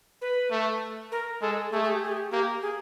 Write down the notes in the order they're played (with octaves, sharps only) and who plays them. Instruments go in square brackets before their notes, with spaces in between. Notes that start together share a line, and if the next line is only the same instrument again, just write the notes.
[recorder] B4
[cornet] A3
[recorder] A#4
[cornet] G#3 [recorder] A4
[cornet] A3 [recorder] G#4
[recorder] G#4
G4
G#4
G4
[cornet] A#3 [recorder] G4
[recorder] G#4